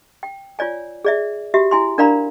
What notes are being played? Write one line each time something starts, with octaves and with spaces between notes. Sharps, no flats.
G5
F4 C#5 D5 G#5
G#4 D5 E5
F#4 G4 E5
E4 G#5 C6
D4 A#4 D5 F5 A#5 B5